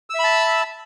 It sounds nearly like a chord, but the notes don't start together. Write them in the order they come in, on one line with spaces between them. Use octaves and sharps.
E6 E5 B5 A5